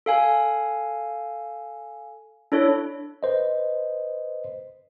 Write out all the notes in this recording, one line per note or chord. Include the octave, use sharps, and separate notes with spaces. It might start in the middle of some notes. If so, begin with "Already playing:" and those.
A4 F5 G#5
D4 E4 A4 C#5
B4 C5 D#5